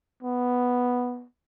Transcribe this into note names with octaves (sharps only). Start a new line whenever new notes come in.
B3